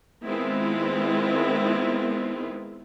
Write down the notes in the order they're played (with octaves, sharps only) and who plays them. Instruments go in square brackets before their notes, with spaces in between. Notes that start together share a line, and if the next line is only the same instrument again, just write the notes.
[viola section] D#3 G#3 B3 C4 E4 F4